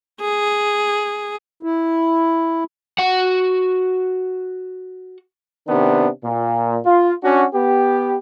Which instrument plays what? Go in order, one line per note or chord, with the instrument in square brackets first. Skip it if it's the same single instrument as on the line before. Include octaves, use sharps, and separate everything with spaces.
[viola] G#4
[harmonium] E4
[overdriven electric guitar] F#4 F#5
[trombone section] C3 D#3 B3 D4
A#2
F4
C#4 D4 F#4
B3 G4